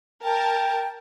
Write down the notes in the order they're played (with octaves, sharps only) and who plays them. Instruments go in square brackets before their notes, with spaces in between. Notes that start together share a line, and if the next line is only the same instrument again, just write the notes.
[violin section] A#4 A5 [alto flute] G5